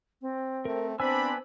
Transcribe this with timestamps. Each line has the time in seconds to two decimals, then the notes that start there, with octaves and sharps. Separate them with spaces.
0.21 C4
0.65 A3 A#4
1.00 B3 C4 D4 C5 G#5 B5 E6